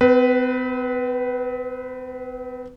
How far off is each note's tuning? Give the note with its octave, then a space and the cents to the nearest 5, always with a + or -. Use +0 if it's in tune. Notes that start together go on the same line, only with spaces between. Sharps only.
C4 -45 B4 +0